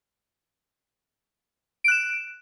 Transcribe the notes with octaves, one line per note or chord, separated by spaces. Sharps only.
F#6 D7 E7